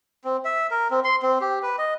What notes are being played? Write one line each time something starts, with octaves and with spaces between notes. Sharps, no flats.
C4
E5
A#4
C4
C6
C4
G4
B4
D#5